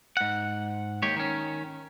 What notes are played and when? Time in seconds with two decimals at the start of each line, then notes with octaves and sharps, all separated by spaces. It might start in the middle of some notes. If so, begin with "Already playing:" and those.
0.17 G#2 F#5
1.02 D#2 D#3 G4 C#5
1.17 D#3 C#4